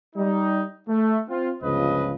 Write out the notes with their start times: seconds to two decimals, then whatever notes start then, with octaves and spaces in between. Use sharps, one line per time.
0.15 G3 D#4
0.87 A3
1.28 C4 F4
1.62 G1 C#2 C#3 F3 B4 D#5